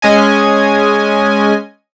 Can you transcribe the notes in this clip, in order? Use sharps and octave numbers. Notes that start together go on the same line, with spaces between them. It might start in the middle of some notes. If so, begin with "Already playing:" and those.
G#3 C#4 D#5 G#5